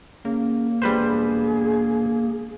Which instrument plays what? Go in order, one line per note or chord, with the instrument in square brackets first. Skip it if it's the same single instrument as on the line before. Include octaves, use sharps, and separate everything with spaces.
[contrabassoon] C#3 [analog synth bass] A#3
[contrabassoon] E1 [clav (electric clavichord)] G3 B4 C5 [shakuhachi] G#4